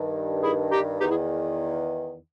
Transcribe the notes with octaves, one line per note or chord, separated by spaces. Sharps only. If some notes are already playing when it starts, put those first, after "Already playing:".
Already playing: G2 D#3
E4 G#4
D#4 G4
E2 D#3 D#4 G4
E4 G#4